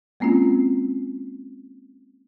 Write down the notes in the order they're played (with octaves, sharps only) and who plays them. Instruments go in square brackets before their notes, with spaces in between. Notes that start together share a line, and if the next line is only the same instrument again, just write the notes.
[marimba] G#3 A#3 C4 C#4 F4